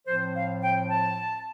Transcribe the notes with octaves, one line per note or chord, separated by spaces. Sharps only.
A2 F3 C4 C5
F5
G5
A5